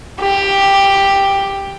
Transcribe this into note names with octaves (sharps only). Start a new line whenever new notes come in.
G4